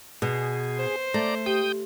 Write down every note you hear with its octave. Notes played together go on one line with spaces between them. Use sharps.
B2 G#4
C5
A3 D5 A#5
G4 G5 D#6 G6